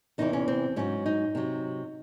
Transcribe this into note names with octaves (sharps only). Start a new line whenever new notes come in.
E2 C3 E3 D#4
C#4
C4
G#2 F#3 C#4
D#4
C3 F#3